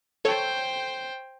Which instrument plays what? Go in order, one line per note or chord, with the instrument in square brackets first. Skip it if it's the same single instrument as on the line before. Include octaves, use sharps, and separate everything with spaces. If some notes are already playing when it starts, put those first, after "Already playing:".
[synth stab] A4 C#5 [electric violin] C5 G5